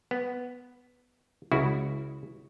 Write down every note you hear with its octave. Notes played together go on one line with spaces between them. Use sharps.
B3
C#2 C#3 E4 F#4